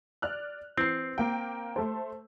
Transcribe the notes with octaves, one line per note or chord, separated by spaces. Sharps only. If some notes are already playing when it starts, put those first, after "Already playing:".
D5 F6 F#6
E3 C4 C7
A#3 G5
A3 A4 C5